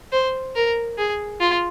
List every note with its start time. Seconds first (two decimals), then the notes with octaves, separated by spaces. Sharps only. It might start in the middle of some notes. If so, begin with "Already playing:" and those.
0.12 C5
0.55 A#4
0.98 G#4
1.40 F4